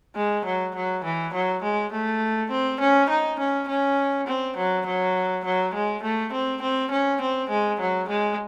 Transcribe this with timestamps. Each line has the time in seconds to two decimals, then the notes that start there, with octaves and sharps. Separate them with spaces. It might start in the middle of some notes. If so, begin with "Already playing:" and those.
0.16 G#3
0.45 F#3
0.75 F#3
1.04 E3
1.33 F#3
1.62 G#3
1.92 A3
2.50 C4
2.80 C#4
3.09 D#4
3.39 C#4
3.68 C#4
4.27 C4
4.57 F#3
4.86 F#3
5.45 F#3
5.74 G#3
6.03 A3
6.33 C4
6.62 C4
6.91 C#4
7.21 C4
7.50 G#3
7.80 F#3
8.09 G#3